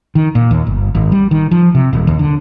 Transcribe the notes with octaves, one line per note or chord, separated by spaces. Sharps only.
D#3
A#2
D#2
G1
G#1
G3
D#3
F3
C3
D#1
D#2
D3